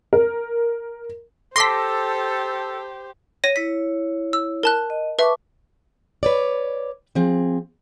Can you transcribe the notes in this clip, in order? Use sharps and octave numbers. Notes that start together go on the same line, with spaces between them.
A#4
G4 A4 C5 A5 C6 D6 A#6 B6
C#5 A#6 D#7
E4 C#5 B6
E6
A#4 A5 F#6
D#5
B4 E5 A5 C#6 D6
B4 C#5 D5
F3 C4 G#4